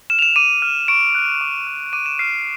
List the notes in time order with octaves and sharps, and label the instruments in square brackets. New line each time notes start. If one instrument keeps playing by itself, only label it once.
[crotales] F6 E7
F7
E7
D6 D#7
F6
C#6 D7
F#6
D6
F6
D6 D#7
E7
F6 C7